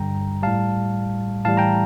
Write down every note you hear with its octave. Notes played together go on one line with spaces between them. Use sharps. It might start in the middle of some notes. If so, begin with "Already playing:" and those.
Already playing: G2 D3 G3 G5 A#5
A2 G3 F5 A5
A2 E3 G3 F5 A5
G5 A#5